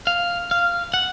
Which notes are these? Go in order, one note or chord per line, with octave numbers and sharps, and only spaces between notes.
F5
F5
F#5